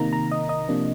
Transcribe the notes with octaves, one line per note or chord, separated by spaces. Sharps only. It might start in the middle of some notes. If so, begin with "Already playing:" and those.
Already playing: C3 D#3 A#3 D#4 A#5
A#5
D#5
D#5
C3 F3 A#3 D4